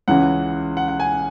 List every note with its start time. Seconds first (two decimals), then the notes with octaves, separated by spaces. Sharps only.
0.08 C#2 C#3 E3 F#5
0.77 F#5
0.88 F#5
1.00 G#5